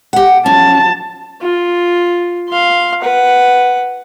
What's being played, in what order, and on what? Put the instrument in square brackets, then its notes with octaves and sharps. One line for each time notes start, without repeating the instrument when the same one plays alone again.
[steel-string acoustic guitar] G4 F#5
[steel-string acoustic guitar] C#4 [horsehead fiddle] A5
[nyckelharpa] F4
F5 C6
B4 F#5